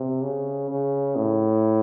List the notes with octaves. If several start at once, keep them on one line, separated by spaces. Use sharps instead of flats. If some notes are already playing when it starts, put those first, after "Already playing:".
Already playing: C3
C#3
C#3
A2